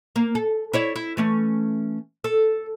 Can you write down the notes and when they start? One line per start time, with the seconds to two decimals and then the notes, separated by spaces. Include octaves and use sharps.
0.16 A#3
0.35 A4
0.73 E4 C#5 D5
0.96 E4
1.17 E3 A3 C#4
2.24 A4